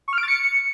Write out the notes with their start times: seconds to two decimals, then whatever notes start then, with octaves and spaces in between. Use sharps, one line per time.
0.08 C#6
0.13 F6
0.18 D7
0.23 A6
0.28 C#7